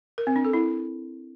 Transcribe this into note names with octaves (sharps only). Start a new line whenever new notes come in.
A#4
C4
D4
A4
E4